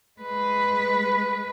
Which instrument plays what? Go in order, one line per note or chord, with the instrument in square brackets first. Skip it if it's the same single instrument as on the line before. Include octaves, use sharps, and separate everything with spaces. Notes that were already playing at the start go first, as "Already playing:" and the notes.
[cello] G#3 B4